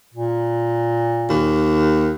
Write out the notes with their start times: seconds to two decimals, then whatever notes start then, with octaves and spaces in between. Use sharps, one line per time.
0.14 A#2
1.29 D#2